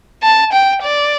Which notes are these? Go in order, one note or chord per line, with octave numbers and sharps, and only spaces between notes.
A5
G5
D5